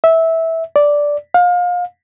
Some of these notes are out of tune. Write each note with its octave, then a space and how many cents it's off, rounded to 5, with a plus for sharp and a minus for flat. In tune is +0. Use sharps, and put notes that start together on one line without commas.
E5 -15
D5 -5
F5 +30